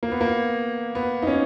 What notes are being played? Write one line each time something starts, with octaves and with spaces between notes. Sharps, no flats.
A#3
B3
A#3
B3
D#4
C#4